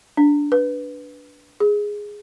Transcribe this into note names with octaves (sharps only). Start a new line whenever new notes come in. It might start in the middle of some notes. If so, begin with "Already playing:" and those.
D4
B4
G#4